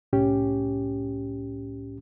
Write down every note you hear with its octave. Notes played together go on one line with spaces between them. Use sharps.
C2 A2 C#4 G4